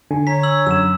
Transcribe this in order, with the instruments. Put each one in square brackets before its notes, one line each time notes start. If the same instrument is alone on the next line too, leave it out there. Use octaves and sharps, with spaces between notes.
[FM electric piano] D3 [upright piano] G#5
[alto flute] C#5 [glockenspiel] A#5 B6
[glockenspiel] E6 F#7
[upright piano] F#2 [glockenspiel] E6 E7